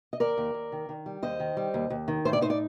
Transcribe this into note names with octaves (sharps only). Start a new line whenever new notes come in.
D#5
D#2 A#4 D5
D#2
D#2
D#3
D#3
G3
D#2 C5 D#5
D#3
G3
D#2
D#2
D#3
A2 C5
D5
D#4 C5
D5